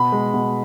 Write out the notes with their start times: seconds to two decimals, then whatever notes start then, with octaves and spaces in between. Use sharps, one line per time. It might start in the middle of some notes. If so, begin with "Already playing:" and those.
Already playing: B2 B5
0.12 G#3
0.34 B2